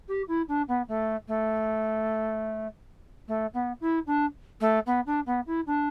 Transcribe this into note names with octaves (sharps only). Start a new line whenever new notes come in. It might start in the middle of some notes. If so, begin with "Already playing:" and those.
G4
E4
D4
B3
A3
A3
A3
B3
E4
D4
A3
B3
D4
B3
E4
D4